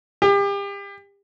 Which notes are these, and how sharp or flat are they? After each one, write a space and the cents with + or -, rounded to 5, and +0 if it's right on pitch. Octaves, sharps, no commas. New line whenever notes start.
G4 +35